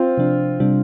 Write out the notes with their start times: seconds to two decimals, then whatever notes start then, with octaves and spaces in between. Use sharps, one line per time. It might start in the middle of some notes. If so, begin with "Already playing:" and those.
Already playing: C4 F4
0.18 C3 F3 D4
0.60 C3 G3 D4